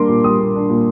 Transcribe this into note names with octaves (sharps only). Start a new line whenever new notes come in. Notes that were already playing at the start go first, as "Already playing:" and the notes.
Already playing: G3 A#3 D4 C6 D6
A#2
G3 D#6
A#3
D4
A#2